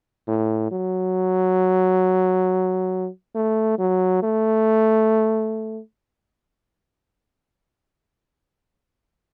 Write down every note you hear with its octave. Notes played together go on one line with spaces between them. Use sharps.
A2
F#3
A3
F#3
A3